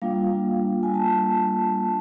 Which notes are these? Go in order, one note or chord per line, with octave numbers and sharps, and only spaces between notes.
G3 A#3 D4 F4 F5
G#5
A5